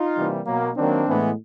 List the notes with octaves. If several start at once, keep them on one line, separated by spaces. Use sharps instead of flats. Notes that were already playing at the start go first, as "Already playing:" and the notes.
Already playing: D#4 F4
C3 E3 G3 A#3
B2 F#3 A#3
D#3 F#3 A#3 C4 D4
A2 E3 G#3 B3